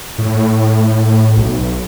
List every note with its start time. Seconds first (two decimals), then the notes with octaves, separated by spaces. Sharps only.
0.18 A2
1.37 B1